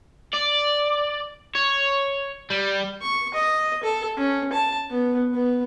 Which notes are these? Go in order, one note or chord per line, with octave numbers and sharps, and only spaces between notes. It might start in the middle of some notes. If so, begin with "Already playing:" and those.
D5
C#5
G3
C#6
D#5
A4
C#4
A5
B3
B3